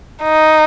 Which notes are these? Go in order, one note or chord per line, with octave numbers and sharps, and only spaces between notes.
D#4